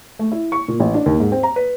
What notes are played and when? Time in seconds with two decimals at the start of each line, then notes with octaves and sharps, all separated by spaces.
0.19 A3
0.32 E4
0.52 C#6
0.68 A#2
0.80 A1
0.94 D4
1.06 D#2
1.20 G#2
1.32 C4
1.43 A#5
1.56 B4